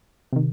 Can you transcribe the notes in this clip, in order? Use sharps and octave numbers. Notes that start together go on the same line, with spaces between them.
C3 D#3